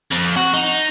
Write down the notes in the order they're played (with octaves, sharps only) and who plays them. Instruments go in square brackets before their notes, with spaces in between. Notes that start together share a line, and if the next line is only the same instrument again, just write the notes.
[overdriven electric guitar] F2
F#4
D#4